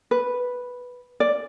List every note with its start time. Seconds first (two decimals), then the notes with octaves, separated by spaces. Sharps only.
0.11 B4
1.20 D5